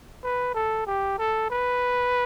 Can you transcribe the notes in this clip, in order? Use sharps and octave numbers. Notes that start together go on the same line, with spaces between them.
B4
A4
G4
A4
B4